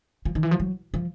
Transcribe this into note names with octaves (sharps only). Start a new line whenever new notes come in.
F3
D#3
E3
F3
F#3
F3